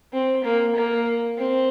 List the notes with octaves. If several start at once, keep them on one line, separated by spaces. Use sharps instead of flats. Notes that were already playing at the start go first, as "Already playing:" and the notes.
C4
A#3
A#3
C4